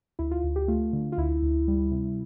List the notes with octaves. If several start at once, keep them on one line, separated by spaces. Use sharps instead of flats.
D2 E4
F4
D2
G4
A3 F4
D3
F4
D2 E4
D2
G3
C3